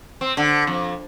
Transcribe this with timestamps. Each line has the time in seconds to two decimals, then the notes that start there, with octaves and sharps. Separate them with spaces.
0.21 C4
0.37 D3
0.67 F2